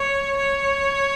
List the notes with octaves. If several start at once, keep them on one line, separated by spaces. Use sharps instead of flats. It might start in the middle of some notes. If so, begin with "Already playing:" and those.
Already playing: C#5
C#5